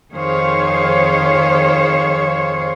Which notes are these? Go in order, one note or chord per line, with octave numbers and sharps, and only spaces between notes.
F2 D#3 G#4 C5 C#5 F5